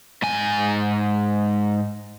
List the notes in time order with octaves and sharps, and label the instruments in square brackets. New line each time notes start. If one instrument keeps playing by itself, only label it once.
[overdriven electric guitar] G#2 G#5